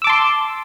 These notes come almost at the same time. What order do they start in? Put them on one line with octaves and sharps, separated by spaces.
E6 D6 A5 C6